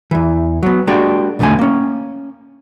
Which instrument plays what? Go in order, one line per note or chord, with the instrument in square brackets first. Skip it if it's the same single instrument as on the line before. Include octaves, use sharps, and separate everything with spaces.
[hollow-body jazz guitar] E2 E3
F#3 B3
G#3 A#3 D4 F#4 G4
B1 E2 B2 D3 A3 G#5
A#3 C#4